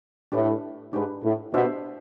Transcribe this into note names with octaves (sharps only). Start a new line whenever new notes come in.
A2 D4 G4 B4
G#2 D4 G4 B4
A2
B2 D4 G4 C5 E5